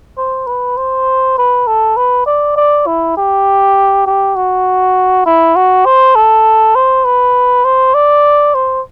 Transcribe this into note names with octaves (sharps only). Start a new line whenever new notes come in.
C5
B4
C5
B4
A4
B4
D5
D5
E4
G4
G4
F#4
E4
F#4
C5
A4
C5
B4
C5
D5
C5